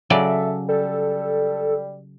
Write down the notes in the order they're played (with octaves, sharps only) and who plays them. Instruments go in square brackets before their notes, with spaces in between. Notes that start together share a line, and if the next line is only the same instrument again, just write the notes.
[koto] C#3 F#3 D5 [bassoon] A4 [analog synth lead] E5
[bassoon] G3 [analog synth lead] A4